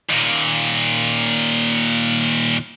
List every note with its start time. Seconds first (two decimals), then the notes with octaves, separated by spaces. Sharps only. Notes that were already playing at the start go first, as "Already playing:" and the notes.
0.10 D#2 A#2